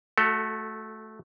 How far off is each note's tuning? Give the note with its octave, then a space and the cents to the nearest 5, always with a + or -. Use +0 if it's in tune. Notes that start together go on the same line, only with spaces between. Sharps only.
A3 -10 F#4 -10 A4 +20